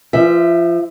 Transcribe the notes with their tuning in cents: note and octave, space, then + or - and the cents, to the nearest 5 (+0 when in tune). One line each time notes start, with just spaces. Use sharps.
F3 -25 E5 +0